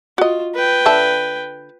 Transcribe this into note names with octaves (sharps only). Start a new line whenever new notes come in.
F4 F#4 D#5
B4 G5
D3 E5 A5